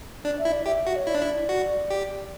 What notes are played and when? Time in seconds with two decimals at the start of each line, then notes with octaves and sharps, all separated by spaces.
0.25 D4 D5
0.38 E5
0.45 E4
0.52 D5
0.66 G4 E5
0.86 F#4
0.96 C#5
1.07 E4 D5
1.15 D4
1.22 E4
1.49 F#4
1.90 G4